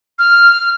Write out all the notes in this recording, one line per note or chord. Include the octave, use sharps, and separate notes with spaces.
F6